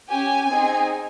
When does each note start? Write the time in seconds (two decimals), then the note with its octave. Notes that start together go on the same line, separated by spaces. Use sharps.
0.10 C#4 G4 G#5
0.49 C4 D#4 G#4